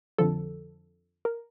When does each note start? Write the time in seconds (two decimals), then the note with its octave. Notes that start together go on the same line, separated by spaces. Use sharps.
0.18 F2 D3 F3 A4
1.25 A#4